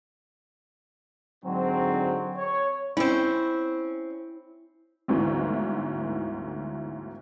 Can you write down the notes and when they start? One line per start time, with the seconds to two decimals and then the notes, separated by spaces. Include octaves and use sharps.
1.44 G#2 D3 F#3 C4
2.36 C#5
2.97 C4 C#4 E4
5.08 G1 D2 G#2 D3 E3